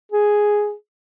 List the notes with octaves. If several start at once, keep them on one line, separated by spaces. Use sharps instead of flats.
G#4